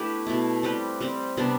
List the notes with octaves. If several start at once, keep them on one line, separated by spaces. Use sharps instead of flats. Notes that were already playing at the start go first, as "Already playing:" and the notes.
Already playing: A3 B3 D4 E4 G4 B4
B2 A3 E4
G3 C4 G4 B4
G3 C4 G4
C3 G3 B3 D4